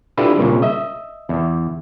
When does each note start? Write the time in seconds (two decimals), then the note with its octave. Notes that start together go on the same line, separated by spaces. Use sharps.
0.17 D4 E4 F4 G4 A4 B4
0.38 C2 A#2 C#3
0.62 D#5 E5
1.29 E2